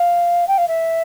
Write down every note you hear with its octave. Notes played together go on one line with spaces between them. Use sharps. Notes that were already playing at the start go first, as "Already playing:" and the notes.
Already playing: F5
G5
F5
E5